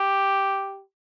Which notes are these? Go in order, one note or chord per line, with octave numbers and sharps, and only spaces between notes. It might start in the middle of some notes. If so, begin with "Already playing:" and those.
Already playing: G4